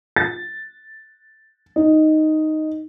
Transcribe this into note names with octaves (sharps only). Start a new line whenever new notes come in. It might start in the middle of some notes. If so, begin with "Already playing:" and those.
A6
D#4